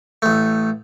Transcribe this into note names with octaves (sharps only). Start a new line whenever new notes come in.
A1 A3